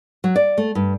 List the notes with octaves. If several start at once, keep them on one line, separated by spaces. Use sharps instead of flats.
F#3
D5
A3
G2